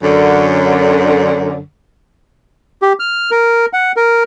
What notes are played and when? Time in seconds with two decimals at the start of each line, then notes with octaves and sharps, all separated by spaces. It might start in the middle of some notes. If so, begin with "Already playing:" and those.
0.02 F#2 D3
2.82 G4
3.00 F6
3.31 A#4
3.73 F#5
3.97 A#4